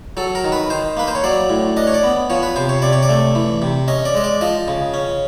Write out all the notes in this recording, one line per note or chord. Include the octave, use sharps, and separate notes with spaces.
F#3 A4
A#4
D#3
B4
D#3 C5
A#3 B4
C5
C#5
F#3 D5
A2
D4 D#5
C#5
D5
B3
F3 C#5
B4
C3 C5
C#5
C3 D5
C#5
D5
A3
E3
C3
C#4 D#5
D5
G#3 D#5
D5
F3 D#5
C#3
C#4